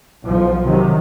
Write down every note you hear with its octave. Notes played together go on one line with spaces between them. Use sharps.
B1 F3
C3 D#3 F#3